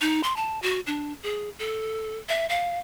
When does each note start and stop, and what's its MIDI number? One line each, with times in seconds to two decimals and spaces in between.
0.01 0.21 63
0.23 0.36 84
0.36 0.61 81
0.62 0.80 66
0.87 1.13 62
1.23 1.50 68
1.59 2.18 69
2.29 2.46 76
2.49 2.79 77